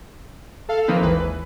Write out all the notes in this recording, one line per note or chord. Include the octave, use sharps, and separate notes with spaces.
A4 F5
D#3 F3 A#3 C4 D#4 B4
G#1 D#2 E3 B4